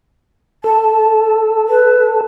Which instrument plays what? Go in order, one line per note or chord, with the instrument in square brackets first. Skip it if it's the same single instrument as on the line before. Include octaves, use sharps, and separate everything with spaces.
[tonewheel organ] A4 [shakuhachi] A5
[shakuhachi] B4